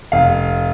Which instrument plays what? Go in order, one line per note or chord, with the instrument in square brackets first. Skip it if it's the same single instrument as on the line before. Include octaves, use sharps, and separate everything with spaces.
[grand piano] F1 F5